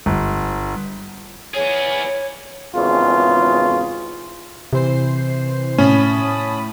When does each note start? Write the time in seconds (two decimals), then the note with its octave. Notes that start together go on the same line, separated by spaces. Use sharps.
0.06 G1
1.54 B3 G#4 C#5
2.75 G#1 E2 C#3 F4
4.73 C3 E3 C5 C7
5.78 A2 C#4 A5 B5 D#6